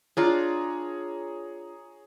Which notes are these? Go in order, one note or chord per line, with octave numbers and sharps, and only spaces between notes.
D4 F4 G#4 C#5 A#5